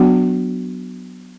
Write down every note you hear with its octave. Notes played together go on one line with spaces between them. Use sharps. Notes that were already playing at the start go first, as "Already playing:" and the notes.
Already playing: F#3 B3 D4 F#4